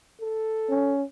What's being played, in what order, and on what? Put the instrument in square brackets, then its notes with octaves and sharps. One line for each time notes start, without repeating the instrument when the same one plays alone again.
[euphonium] A4
[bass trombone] C#4